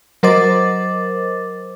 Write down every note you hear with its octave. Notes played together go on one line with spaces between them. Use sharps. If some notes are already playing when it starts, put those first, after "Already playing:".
F#3 A#4 C5 D#5 D6 A6